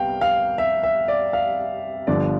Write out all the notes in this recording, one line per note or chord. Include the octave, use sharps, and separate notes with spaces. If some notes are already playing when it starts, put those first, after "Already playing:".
Already playing: C2 C3 G3 B3 F5 G5
F5
E5
E5
D5
F5
G1 G2 D3 F3 D5